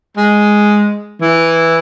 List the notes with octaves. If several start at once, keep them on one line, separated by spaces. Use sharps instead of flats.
G#3
E3